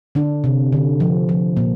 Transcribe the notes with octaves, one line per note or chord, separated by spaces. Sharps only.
D3 D4
C3
D3
F3
F3
A#2 A#3